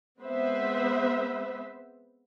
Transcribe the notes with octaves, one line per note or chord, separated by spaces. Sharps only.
G#3 B3 C4 B4 C5 E5